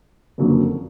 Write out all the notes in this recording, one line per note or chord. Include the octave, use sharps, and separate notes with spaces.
F#1 F2 D3 F#3 A#3